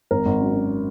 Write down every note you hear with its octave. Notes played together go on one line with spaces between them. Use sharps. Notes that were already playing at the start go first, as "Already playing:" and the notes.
G#1 A#4
G#1
F#2
F#2